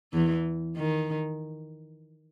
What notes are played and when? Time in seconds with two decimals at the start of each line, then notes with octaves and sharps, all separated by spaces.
0.13 E2 E3
0.76 D#3